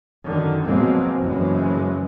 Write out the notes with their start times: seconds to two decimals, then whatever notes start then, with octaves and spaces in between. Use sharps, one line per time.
0.24 F#2 D3 D#3
0.64 B2 F3 F#3 G#3 A#3 C4
1.22 F#1 F#2 E3 F3 G#3 C#4